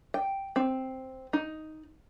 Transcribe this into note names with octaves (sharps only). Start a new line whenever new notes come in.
G5
C4
D#4